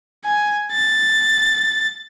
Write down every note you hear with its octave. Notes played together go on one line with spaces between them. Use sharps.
G#5
A6